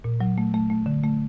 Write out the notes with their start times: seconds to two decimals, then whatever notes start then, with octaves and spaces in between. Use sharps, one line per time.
0.04 A#2
0.20 F#3
0.38 A3
0.54 A3
0.70 A3
0.86 D3
1.04 A3